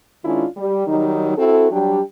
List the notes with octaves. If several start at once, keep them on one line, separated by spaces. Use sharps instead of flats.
D#3 G#3 C#4 D4 E4 F4
G3
D#3 F#3 G3 D#4
C4 E4 F#4 A4
F#3 G3 D4 G4